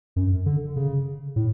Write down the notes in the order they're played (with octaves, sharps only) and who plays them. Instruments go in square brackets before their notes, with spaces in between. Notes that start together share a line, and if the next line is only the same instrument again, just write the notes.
[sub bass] F#2
D3
C#3
A2